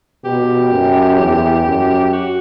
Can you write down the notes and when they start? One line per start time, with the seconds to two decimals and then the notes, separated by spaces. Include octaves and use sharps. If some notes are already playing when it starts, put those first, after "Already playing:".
0.24 B2 G4
0.72 F#2
1.19 E2
1.66 F#2
2.13 F#4